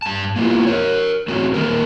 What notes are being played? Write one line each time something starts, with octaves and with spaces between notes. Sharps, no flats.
G2 A5
A#3 B3 E4 F4 G4
A#4 C#5
A3 C4 C#4 F#4
D#3 G3 A#3 A#4